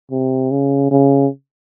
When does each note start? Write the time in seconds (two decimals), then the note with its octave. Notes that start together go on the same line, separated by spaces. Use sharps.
0.11 C3
0.51 C#3
0.91 C#3